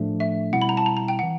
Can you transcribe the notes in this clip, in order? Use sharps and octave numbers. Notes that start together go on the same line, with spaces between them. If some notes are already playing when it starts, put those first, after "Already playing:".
Already playing: A2 F3 A3 D4
E5
B2 G3 C4 E4 F#5
B5
A#5
A5
A#5
A#5
G5
E3 F#5